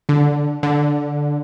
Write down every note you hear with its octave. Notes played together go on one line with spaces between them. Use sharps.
D3
D3